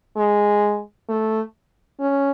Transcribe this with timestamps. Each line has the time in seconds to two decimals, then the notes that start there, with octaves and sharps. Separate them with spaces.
0.17 G#3
1.09 A3
2.00 C#4